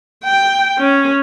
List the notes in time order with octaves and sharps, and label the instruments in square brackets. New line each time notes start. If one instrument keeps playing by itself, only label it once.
[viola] G5
C#4